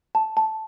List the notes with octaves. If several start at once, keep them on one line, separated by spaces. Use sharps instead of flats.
A5
A5